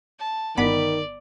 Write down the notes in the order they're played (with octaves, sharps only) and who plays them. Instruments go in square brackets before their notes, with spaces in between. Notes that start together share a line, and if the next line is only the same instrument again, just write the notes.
[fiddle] A5
[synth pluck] G1 B3 B5 [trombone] D#3 [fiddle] D5